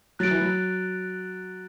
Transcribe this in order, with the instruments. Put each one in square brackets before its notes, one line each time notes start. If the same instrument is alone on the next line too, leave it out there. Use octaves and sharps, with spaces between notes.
[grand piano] F#3 [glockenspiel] F#6 A6 D7
[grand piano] E3
F#3